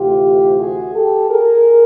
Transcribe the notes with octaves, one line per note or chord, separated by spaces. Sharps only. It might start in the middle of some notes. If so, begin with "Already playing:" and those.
Already playing: D2 C3 E3 A3 F4 G4
F#4 G#4
G4 A4
G#4 A#4